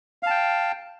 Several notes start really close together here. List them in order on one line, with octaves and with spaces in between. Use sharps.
F5 A5 G5